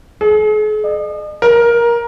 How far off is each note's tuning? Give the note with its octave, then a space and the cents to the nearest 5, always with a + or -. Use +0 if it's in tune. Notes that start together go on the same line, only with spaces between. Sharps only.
G#4 +45
D#5 -45
A#4 +15